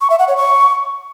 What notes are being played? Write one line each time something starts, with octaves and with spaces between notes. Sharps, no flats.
C#6
E5
F#5
C#5
C#6